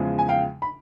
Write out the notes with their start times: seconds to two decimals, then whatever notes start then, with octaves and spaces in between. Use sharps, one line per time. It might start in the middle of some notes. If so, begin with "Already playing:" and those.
Already playing: E2 C#3 F3 G#3
0.19 G#5
0.29 F5 G5
0.62 B5